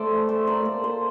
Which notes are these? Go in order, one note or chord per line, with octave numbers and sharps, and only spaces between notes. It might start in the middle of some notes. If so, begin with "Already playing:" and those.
Already playing: A3 A4 C5 D5
A4 C5
A#4 D5
A#3 A4 C5
A4 C5